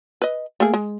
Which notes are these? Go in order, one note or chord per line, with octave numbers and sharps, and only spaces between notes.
B4 D#5
A3 A#3 G#4
G#3